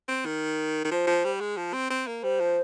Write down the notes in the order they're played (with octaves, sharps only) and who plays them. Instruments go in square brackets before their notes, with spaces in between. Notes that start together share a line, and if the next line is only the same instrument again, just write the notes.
[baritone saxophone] C4
D#3
D#3
[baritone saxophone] F3 [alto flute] C5
[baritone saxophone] F3
G3
G#3
F3
C4
C4
A#3
[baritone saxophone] G3 [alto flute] C5
[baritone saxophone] F3